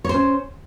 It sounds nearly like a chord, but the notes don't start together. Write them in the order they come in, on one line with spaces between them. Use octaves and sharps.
C#5 C5 C#4